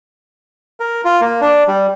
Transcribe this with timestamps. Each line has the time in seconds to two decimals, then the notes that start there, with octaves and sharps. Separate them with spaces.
0.80 A#4
1.05 F4
1.21 A#3
1.41 D4
1.68 G3